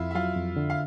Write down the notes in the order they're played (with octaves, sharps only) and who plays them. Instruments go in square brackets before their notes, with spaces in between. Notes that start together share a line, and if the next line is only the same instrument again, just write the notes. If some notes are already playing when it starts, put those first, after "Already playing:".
Already playing: [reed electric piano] F2 [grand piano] E4 F4 E5 F5
[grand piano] E5
[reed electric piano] F#3 [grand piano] F4 F5
[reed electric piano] F2
D3
[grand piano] F5